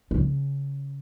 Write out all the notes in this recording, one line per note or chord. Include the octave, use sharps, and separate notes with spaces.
C#3 C#4